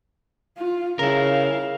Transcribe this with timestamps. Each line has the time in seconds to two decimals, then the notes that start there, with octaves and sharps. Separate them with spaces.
0.58 F4
0.99 C#3 E4 A#4 F5